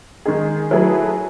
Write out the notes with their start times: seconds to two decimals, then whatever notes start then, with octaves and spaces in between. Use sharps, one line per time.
0.26 D#3 G#3 D#4 G#4
0.71 F#3 A3 E4 G#4 B4